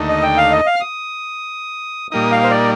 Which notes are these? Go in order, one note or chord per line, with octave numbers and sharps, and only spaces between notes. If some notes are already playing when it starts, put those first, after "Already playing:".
Already playing: D#2 D3 A3 D#4
D#5
G5
F5
D#5
F5
F6
D#6
A#2 G3 A#3 D#4 D#6
F5
C5
D5